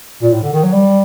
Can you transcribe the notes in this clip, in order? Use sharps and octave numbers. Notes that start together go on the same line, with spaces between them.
A#2
A2
D3
D#3
F#3
G3